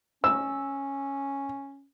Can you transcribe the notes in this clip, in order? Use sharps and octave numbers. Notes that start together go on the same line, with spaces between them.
C#4 E6